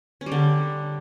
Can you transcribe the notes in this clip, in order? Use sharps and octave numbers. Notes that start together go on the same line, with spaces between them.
C#4
G3
D3